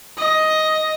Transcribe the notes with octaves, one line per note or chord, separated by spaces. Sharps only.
D#5